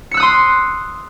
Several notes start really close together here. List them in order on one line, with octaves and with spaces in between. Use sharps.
C#7 E6 F#6 D#6 C6